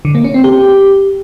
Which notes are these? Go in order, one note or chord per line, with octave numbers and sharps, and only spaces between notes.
D3
A#3
C#4
C4
G4